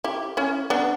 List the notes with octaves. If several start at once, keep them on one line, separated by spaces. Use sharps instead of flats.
E4 G4
C#4 E4
B3 D4